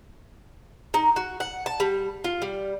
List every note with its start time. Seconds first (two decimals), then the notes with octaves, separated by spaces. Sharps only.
0.94 D#4
1.16 F#4
1.40 F#5
1.66 A5
1.80 G3
2.24 F4
2.42 G3